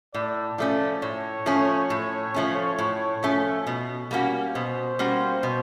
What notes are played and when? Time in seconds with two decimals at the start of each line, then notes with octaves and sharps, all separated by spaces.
0.14 A2 D5
0.58 F3 A3 C#4 D5
1.02 A2 C#5
1.46 F3 A3 C#4
1.90 A2
2.34 F3 A3 C#4
2.79 A2
3.23 F3 A3 C#4
3.67 B2
4.11 G3 A#3 C#4 F#4
4.55 B2 C5
4.99 G3 A#3 C#4 F#4
5.43 B2